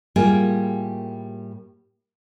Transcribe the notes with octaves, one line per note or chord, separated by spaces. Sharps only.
A2 G3 A#3 F4 G#4